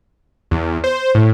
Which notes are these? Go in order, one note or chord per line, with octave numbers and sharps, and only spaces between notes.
E2
C5
A2